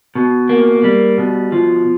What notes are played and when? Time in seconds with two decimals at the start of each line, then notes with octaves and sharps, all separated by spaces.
0.15 B2
0.49 A#3
0.84 G3
1.18 B2
1.52 F3